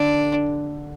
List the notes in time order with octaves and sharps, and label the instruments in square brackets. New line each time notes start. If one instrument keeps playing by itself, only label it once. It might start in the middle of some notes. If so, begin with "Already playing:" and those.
Already playing: [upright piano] D3 [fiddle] D4